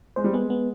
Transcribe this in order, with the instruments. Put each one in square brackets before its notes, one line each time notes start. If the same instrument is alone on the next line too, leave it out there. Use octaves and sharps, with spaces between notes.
[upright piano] G#3 [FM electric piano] C5
[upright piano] G3
[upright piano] G#3 [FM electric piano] B3
[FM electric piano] B3